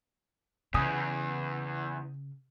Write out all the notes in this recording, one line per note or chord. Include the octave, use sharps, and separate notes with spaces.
E2 C#3 G#5 D#6